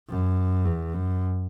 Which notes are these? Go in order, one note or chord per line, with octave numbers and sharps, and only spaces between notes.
F#2
E2
F#2